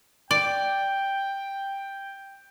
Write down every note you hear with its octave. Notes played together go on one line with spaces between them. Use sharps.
D5 G5